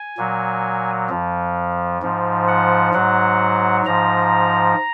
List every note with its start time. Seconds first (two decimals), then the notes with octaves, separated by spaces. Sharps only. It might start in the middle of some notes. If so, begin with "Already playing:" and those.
Already playing: G#5
0.18 A#2 F#3
1.09 F2 F3
2.02 G#2 F3
2.48 F#5
2.93 G#2 F#3 F#5
3.86 G#2 F3 A#5